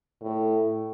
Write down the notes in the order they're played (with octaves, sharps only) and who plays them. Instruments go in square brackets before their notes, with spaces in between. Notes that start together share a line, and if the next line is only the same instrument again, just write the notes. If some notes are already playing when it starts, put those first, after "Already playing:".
[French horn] A2